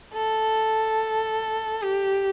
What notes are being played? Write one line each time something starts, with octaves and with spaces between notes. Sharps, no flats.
A4
G4